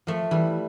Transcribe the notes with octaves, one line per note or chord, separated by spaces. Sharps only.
F3 A3
E3 G3